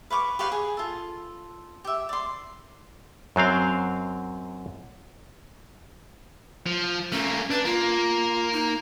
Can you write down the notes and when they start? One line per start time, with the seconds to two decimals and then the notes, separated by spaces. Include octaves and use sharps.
0.10 B4 F5 C#6 D6
0.39 G4 B4 C#5 F5
0.52 G#4
0.77 F4 A4
1.84 G4 E5
2.09 D5 C6
3.36 F#2 F#3 C4 F5
6.66 F3
7.12 A3 A#3 C#4
7.51 D4 B4
7.65 A#3 F4
8.53 D#4